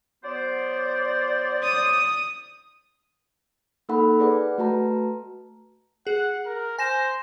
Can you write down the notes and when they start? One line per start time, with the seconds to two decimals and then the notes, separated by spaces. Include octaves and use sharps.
0.24 F#3 B3 C5 D5
1.63 D#6
3.89 A#3 D#4 A4 F#5 B5
4.20 G#4 B4 D5 F#5
4.58 A3 F#4 B4 A5 A#5
6.07 G#4 F#5
6.46 A#4
6.78 C5 G#5 A#6 E7